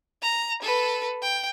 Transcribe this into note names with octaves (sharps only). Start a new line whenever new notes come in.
A#5
A4 B4
G5